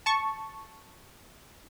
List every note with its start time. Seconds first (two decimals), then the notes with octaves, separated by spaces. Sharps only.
0.06 A5 C#6